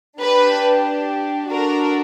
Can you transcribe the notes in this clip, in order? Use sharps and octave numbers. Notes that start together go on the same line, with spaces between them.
D4 G4 B4
D4 F#4 A4 A#4